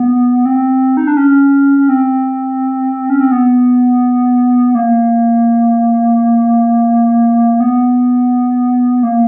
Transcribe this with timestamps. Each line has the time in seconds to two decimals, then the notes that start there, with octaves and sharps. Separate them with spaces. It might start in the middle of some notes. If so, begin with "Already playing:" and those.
Already playing: B3
0.45 C4
0.97 D#4
1.07 D4
1.17 C#4
1.78 C#4
1.89 C4
3.10 C#4
3.20 C4
3.31 B3
4.75 A#3
7.60 B3
9.03 A#3